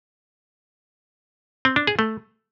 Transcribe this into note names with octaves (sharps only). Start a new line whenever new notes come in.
C4
D4
G#4
A3